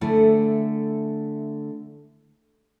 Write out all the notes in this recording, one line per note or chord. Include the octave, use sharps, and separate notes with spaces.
D3 A3 E4 A4 G#5